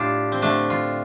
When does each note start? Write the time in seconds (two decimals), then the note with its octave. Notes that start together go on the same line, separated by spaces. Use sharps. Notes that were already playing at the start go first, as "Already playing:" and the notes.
Already playing: A2 G3 D4 F4 G4
0.32 C4
0.42 D3 A3 D4
0.70 F4